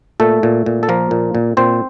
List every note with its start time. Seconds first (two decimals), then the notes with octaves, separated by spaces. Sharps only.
0.20 A#2 A3 A4
0.43 A#2
0.66 A#2
0.83 A4
0.89 F3 A#3 A#4
1.11 A#2
1.35 A#2
1.57 A#2 C4 C5